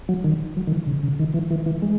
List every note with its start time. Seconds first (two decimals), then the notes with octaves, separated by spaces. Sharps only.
0.09 F#3
0.24 D#3
0.56 F#3
0.67 D#3
0.72 E3
0.87 C#3
1.03 C#3
1.19 D#3
1.34 E3
1.51 E3
1.66 E3
1.82 G#3